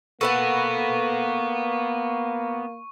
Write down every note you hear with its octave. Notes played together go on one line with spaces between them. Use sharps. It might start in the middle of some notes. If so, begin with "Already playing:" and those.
A#3 B3 F#4 A4 B4 F#5 C#6